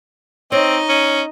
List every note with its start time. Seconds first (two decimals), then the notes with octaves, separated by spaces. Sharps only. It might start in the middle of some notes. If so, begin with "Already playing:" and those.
0.52 C4 D#4 C#5 D#5
0.89 C#4